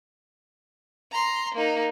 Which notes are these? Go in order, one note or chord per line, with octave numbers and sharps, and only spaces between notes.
A#5 C6
A#3 D#4